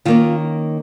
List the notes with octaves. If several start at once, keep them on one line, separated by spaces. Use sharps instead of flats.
D#3 A#3 C#4 F4